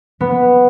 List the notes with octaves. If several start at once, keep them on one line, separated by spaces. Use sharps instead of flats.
B3